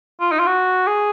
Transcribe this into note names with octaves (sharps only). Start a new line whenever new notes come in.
F4
D#4
F4
F#4
G#4